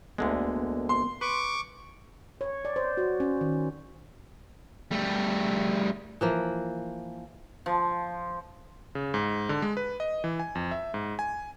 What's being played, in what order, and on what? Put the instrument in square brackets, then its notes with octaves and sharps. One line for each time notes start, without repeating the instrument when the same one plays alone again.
[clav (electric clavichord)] D2 D3 G#3 [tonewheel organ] A#3 B3
[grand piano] C6
[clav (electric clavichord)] B4 [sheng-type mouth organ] C#6 D6
[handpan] C#5
D5
C5
F#4
C#4
D#3
[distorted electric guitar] G3 A3
[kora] E3 F3 A#3
[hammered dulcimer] F3
[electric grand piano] C#3
G#2
D3
G#3
B4
D#5
E3
G#5
F2
E5
G#2
G#5